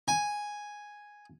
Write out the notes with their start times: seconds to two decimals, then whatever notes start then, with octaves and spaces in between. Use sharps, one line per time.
0.08 G#5